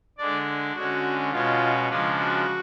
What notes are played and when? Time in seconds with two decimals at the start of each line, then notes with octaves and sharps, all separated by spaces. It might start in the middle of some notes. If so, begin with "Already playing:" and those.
0.18 D3 G#3 D4 D5
0.75 D3 G#3 C#4 F#4
1.32 B2 G#3 C#4 F4
1.89 C#3 F3 G#3 D4 F4
2.18 F#4